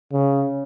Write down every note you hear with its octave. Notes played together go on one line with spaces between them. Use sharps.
C#3